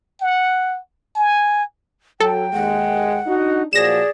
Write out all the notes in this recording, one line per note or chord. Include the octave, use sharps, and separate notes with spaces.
F#5
G#5
F#3 A4 G5
D#2 G#3 F#5
D4 D#4 F#4
A#2 F3 F#3 G#4 D5 A#6 E7